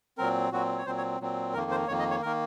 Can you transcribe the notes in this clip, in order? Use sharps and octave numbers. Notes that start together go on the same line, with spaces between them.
A#2 F#3 C4 A#4
A#2 F#3 C4 F#4
C#5
A#2 F#3 C4 C5
C#5
A#2 F#3 C4
F2 D#3 A#3 A#4
C5
F2 D#3 A#3 C#5
D#5
C#5
D#3 A#3 A#4